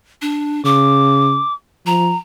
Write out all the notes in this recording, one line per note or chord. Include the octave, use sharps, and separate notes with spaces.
D4
C#3 D6
F3 A#5